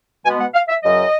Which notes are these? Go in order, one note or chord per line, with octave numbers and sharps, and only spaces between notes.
B2 G#3 B3 G#5
F#5
F5
E5
F#2 C#3 F#3 D#5